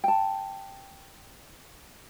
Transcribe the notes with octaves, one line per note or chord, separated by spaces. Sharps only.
G5 A5